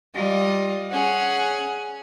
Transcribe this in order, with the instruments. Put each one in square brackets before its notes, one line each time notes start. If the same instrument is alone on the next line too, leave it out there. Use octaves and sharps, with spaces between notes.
[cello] G3 [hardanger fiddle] F4 D#5
[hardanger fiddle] C#4 G#4 [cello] F#5